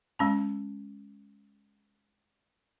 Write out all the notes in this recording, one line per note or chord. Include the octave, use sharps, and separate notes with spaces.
G#3 C#4 A5